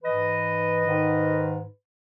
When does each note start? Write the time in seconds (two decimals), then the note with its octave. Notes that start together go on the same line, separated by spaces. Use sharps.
0.03 G#2 E3 B4 D#5
0.85 G#2 D#3